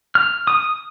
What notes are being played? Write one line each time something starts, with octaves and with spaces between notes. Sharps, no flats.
F6
D#6